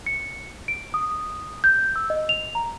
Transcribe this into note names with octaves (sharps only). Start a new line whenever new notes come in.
C#7
D7
D#6
G6
E6
D#5
F7
A#5